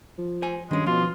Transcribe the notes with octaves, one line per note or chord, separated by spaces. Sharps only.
F3
C5 G#5
G2 D#3 G#3 C#4
B2 F3 F4